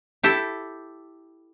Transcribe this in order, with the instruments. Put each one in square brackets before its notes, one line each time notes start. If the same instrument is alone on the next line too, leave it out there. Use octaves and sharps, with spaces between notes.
[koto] E4 G4 A4